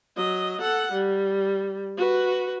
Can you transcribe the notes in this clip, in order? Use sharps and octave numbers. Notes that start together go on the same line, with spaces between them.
F#3 D#5
A4 F#5
G3
F#4 B4